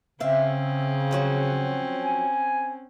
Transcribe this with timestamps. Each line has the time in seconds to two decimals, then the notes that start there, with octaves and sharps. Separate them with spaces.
0.20 C#3 C4 C#4 E5 F5
1.11 F3 F#3 F#4
2.03 G#5